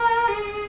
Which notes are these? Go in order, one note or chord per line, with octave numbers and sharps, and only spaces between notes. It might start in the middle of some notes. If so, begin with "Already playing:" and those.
Already playing: A#4
G#4